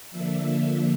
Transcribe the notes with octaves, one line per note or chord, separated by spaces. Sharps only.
D3 F3 A#3 D4 E5
E5